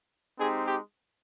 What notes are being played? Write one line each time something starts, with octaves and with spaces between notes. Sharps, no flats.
G#3 C4 D#4 G4 G#4
G4